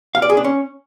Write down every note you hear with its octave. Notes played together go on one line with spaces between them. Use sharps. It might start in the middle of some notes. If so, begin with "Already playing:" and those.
F5
D5
G#4
D4
C#4